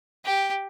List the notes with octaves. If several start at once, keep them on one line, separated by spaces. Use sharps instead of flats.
G4